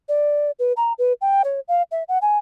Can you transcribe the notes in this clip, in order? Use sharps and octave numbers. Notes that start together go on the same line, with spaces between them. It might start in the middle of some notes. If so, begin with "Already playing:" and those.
D5
B4
A#5
B4
G5
C#5
F5
E5
F#5
G#5